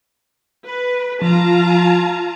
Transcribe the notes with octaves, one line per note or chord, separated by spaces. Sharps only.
B4
F3 F4 A5 A#5